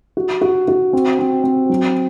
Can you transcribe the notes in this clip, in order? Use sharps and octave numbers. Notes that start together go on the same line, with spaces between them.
F#4
F#4
F#4
C4
C4
C4
F#3